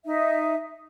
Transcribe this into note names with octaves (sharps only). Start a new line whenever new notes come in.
D#4 E5